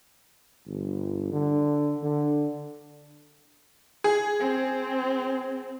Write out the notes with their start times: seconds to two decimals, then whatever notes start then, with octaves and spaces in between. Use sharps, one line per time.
0.68 G1
1.33 D3
2.04 D3
4.04 G#4
4.39 C4